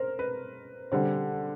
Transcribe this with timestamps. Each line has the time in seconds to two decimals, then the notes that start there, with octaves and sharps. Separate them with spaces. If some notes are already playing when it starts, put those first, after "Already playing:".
Already playing: A#4 C5
0.19 B4
0.92 D3 G3 C5